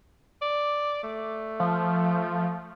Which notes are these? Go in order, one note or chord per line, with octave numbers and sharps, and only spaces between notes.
D5
A3
F3